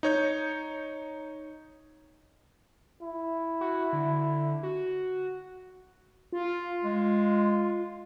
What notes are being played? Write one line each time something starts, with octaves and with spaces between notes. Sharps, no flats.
D#4 C#5 G6
E4
F#4
D3
F#4
F4
G#3